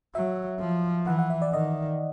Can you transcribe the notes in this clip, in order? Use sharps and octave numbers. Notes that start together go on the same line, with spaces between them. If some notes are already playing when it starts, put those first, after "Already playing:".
F#3 E5
F3
E3 F#5
F#5
E5
D5
D#3 D#5